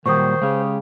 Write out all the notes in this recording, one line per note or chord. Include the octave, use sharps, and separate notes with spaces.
A#2 D#3 F#3 G3 C5 C#6 D#6
C#3 G#3 C#4 G4